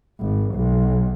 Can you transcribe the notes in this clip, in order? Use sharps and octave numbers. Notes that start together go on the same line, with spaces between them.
G#1
B1